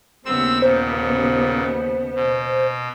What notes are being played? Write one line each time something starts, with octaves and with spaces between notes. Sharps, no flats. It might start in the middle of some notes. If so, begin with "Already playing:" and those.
D#2 C#3 B3 C4 E6
A#2 C5
B2